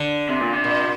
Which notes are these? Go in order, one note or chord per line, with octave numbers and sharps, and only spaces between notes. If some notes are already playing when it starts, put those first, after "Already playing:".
Already playing: D3
C3
A#2
C3
A#2